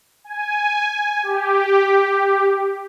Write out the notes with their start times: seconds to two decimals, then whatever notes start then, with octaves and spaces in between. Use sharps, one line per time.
0.24 G#5
1.23 G4